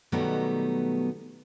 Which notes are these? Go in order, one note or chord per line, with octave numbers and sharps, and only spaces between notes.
B2 D#3 F#3 G3 A3 B3